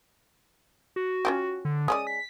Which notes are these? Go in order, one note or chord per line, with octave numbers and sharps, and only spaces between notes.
F#4
C#4 F4 G4
D3
G#3 C#4 D5 D#6
B6